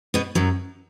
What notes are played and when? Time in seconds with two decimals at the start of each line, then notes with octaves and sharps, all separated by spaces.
0.14 B2 B3
0.35 F#2 F#3